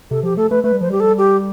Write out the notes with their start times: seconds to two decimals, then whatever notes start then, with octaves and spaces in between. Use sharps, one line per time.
0.11 C3 A4
0.23 F3 G4
0.37 A3 A4
0.50 A3 B4
0.64 A3 B4
0.72 G3
0.81 F3 C5
0.89 G3 G4
1.00 A4
1.18 G4